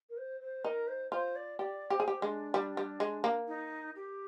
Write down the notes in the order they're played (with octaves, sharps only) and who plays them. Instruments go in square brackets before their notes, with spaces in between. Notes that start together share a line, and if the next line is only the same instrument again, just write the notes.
[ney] A#4
C5
C5
[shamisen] D#4 [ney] A#4
[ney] C5
[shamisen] F4 [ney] C5
[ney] D5
[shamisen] G4 [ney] D5
[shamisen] G4 [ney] C5
[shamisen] G#4
G4
[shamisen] G#3 [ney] D4
[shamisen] G3
G3
G#3
A#3
[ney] D#4
G4